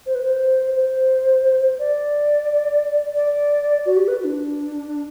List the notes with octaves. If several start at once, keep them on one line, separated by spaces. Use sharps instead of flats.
C5
B4
C5
C5
D5
D5
F#4
G4
B4
F#4
D4